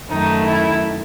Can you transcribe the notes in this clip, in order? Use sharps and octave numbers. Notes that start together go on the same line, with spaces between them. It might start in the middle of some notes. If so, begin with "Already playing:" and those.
F#2 D#3 A3 D#4
E4